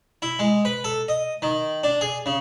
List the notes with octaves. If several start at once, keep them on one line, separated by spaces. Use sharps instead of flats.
E4
G#3
B4
A4
D#5
D#3
D4
G#4
C#3